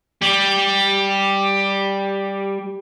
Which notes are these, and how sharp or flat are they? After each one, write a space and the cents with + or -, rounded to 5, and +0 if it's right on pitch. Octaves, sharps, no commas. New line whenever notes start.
G3 +0 G4 +10